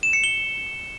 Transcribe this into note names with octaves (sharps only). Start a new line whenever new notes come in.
E7
C#7
G7